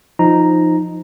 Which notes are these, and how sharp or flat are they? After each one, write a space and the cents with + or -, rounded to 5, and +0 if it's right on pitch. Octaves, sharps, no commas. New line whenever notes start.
F3 +0 D#4 +0 A#5 +0